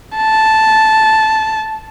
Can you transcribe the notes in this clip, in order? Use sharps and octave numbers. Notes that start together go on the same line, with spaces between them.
A5